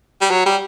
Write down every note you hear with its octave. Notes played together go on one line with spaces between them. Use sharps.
G3
F#3
G3